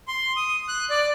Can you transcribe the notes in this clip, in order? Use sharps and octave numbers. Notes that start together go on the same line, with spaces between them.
C6
D#6
F#6
D5